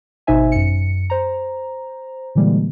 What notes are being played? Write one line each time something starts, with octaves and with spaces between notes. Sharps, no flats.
G#1 B2 D#4 C5 E5 G#5
F#2 C#7
C5 A#5
A#2 D3 E3 G3 G#3 A#3